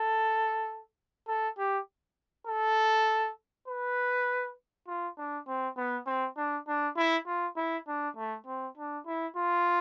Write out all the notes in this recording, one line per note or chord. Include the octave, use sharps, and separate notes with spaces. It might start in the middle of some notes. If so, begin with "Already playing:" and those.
Already playing: A4
A4
G4
A4
B4
F4
D4
C4
B3
C4
D4
D4
E4
F4
E4
D4
A3
C4
D4
E4
F4